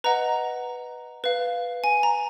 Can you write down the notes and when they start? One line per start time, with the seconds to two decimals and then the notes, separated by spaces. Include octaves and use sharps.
0.04 B4 D#5 F#5 A#5
1.24 B4 F5
1.84 G#5
2.03 A#5